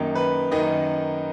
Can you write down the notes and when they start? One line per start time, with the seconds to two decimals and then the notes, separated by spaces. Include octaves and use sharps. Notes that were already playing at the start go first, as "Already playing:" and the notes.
Already playing: F#2 D#3 A#3 D#4
0.15 B4
0.51 F#2 D#3 A#3 D#4 D#5